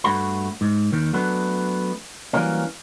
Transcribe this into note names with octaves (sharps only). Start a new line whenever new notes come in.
G2 A3 F#4 B5
G#2
D#2 D#3
F#3 A3 B3 D4
E3 F#3 G3 A#3 C#4